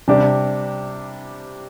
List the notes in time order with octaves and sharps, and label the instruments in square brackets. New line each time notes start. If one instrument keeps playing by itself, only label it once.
[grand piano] C3 G3 D4 G4